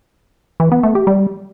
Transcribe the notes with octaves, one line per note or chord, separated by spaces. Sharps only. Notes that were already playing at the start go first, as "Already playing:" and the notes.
E3
B3
A3
G4
G3